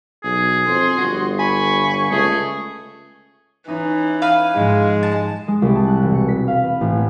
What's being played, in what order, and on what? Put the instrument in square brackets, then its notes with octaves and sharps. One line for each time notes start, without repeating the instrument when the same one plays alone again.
[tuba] B1 [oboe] G#4
[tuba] F2 [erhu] C6
[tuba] G1 [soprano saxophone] F#4
[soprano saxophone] G#5 [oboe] B5 [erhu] C#6
[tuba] C#2 [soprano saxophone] A3 [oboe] G#4
[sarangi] E3 [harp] C#4 D#4
[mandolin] B4 F5 G#5
[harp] G#2 F3 [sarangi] G#3
[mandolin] A5
[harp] G#3
C2
A5
F#6
E1
C#7
B6
F5
B4
A1
B3